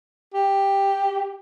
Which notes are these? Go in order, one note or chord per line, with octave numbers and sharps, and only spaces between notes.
G4